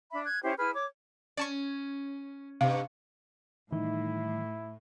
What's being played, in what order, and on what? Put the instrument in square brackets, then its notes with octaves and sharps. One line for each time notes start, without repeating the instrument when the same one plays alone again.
[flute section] D4 E5 B5
F#6 G#6
C#4 E4 G4 C5
E4 G#4 B4 F6
C#5 D6
[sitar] C#4 [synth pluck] D5 A5 C#6
[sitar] G2 [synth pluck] C3 [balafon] F5
[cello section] A2 [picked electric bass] D#3 E3 G3 [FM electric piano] D#4 [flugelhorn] E4